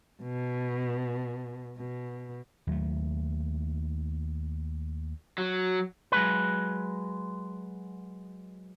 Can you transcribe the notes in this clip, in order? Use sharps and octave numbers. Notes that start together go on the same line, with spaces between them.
B2
B2
D#2 F#3 A3
F#3
F#3 G#3 B4